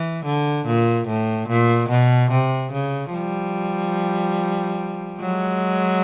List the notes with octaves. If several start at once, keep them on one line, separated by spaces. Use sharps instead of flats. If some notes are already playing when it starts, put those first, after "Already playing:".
Already playing: E3
D3
A#2
A2
A#2
B2
C3
C#3
F3 G3
F#3 G#3